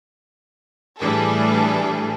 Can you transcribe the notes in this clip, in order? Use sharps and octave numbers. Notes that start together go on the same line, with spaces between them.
A2 E3 G3 D4 G#4 A4